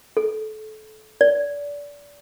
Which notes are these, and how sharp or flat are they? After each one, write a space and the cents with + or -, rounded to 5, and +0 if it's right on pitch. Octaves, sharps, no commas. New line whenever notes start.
A4 -25
D5 -25